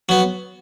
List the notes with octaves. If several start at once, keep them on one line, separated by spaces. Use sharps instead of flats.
F#3 B3